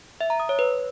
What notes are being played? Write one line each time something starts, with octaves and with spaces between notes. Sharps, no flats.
E5
A#5
D#6
C#5
B4